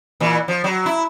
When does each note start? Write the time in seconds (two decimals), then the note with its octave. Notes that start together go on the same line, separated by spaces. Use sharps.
0.20 A#2 E3
0.48 F3
0.64 F#3
0.86 E4